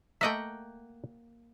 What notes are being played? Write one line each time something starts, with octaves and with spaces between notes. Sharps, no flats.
A3 A#3 D#5 E5 F#5 G5